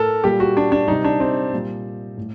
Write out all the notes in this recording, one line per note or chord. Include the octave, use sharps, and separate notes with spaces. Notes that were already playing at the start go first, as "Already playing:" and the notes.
Already playing: A2 A4 A#4
A#2 G3 G4
F#4
D4
D4
C3 G3 D#4
D4
C4
A#2 G3
A2